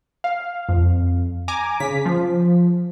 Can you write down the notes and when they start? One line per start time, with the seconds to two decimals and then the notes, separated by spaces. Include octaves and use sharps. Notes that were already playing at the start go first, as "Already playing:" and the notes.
0.24 F5
0.69 F2
1.48 G#5 A#5 D6
1.80 C#3 B6
2.06 F3